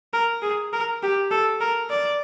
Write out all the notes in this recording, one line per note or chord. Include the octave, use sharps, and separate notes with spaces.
A#4
G#4
A#4
G4
A4
A#4
D5